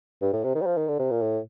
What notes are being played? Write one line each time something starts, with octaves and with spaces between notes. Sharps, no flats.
G2
A2
C3
D#3
G3
F3
D#3
D3
C3
A#2
A2